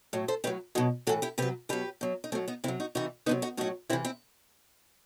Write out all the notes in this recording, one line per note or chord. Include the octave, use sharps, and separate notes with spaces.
A2 F#3
A4 C5
A2 F#3 G4 B4
B2 F#3 D#4 F#4
A2 E3 F#4 A4
E4 G4
C3 F#3 G4 B4
B2 F#3 G4 B4
B2 F#3
D#4
B2 F#3 A3 C4
B3 D#4
C3 F#3 C4 E4
D#4 F#4
C3 E3 D#4 F#4
C3 D#3 F#3 B3 D#4
D#4 F#4
A2 F#3 D#4 F#4
C3 E3 C4 E4
C4 E4